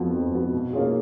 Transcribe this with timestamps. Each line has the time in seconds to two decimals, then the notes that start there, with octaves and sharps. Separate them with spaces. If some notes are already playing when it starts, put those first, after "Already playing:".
Already playing: F2 F3 B3 F#4
0.12 F2
0.32 F3 B3 F#4
0.53 B2
0.73 A#3 C#4 F4 G#4